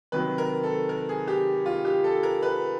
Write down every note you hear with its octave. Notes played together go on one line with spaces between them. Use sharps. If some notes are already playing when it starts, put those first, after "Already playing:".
C3 D#3 F#3 B4
A#4
A4
A#4
G#4
G4
F4
G4
A4
A#4
B4